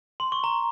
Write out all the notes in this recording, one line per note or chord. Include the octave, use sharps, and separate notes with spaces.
C6
C#6
A#5